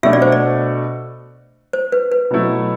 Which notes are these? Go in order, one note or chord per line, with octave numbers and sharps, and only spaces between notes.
B2 A3 D4 F#4 E5
D5
C5
D5
C5
B4
B4
B2 F#3 A3 E4